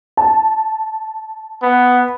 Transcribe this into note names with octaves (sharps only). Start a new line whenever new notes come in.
A5
B3